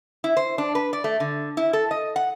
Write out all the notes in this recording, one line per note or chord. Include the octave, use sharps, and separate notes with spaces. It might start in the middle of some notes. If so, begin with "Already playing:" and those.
E4
C5
D4
B4
D5
A3
D3
E4
A4
D#5
F#5